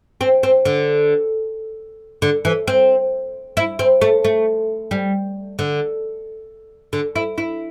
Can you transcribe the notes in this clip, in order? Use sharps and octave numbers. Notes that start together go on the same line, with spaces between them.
C4
C4
D3
D3
E3
C4
E4
C4
A3
A3
G3
D3
D3
E4
E4